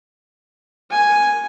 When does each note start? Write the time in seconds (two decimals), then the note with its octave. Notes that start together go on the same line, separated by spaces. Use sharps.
0.91 G#5